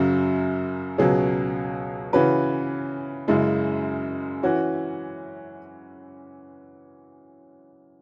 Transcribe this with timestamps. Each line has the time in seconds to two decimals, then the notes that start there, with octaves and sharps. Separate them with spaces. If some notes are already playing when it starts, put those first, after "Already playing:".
Already playing: F#2 C#3 F#3
0.98 C#2 B2 F#3 C#4 G#4
2.13 C#3 E3 C#4 F#4 B4
3.28 F#2 C#3 G#3 E4
4.43 E3 C#4 F#4